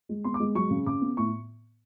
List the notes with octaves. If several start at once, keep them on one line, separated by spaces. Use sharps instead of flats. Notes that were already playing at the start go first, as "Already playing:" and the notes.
G#3
B3 C6
D6
G#3
F#3 C#6
C#3
C#3 D6
B3
A2 C#6